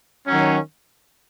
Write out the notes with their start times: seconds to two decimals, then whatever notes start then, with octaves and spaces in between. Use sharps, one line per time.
0.27 D#3 F#3 C#4